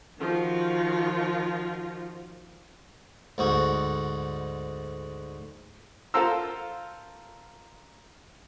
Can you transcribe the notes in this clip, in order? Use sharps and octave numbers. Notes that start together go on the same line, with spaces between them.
D#3 F3 F4 F#4
D2 G#2 F#4
F4 A4 A#4 C5 A#5 E6